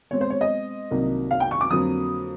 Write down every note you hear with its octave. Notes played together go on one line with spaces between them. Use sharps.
B2 G#3 C4 C#5
C5
C#5
D#5
C2 C3 D#3 F#3 A#3
F5
G5
C#6
D6
F2 D3 F#3 A#3 D#6